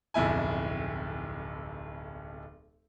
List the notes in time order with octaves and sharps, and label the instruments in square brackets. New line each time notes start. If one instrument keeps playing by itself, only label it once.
[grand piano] D1 B1 F2 E4 G#5